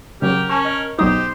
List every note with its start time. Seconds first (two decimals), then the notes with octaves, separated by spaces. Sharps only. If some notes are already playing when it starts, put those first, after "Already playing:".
0.22 C#3 F#3 G4 A#4
0.49 C#4 G#5 A5 C#6
0.65 A#4 D#5
0.99 B1 F#3 D#4 G4 C5 D6 D#6